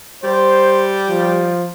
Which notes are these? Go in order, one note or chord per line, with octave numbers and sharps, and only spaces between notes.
G3 C5
F3